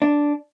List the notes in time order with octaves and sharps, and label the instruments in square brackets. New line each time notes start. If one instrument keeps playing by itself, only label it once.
[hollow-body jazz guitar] D4